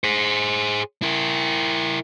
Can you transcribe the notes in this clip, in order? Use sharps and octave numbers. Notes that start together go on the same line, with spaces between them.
G#4 C5
E4 A#4